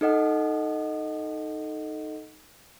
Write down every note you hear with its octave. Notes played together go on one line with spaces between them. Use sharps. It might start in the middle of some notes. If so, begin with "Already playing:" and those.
D#4 A4 D#5 F#5